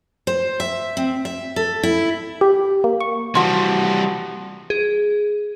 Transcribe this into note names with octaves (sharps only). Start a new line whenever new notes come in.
C5
E5
C4
E5
A4
E4
G4
A#3
C#6
E3 F3 G3 F#4 C6
G#4